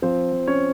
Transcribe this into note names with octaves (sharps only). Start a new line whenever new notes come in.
F3 C4 C5
F3
C#4 C#5